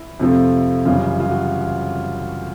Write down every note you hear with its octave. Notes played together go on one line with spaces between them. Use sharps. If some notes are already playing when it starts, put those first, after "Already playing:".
Already playing: E4
F2 C3 F3 A3
F#2 C#3 E3 G3 F4
F4
F#4